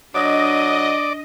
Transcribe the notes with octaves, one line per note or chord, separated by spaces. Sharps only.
F#3 D4 D5 D#5